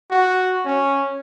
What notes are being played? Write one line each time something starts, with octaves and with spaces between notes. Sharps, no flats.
F#4
C#4